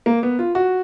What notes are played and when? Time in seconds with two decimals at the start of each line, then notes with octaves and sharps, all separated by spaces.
0.06 A#3
0.23 B3
0.39 F4
0.55 F#4